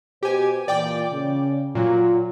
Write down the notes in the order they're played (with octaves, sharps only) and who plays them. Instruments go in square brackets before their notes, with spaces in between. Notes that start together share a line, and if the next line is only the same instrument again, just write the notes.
[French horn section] B2 C5 [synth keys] G4 G#5
[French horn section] A#2 E3 [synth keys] D5 G5 D6
[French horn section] C#3
[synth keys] A#2 F#3 [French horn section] F4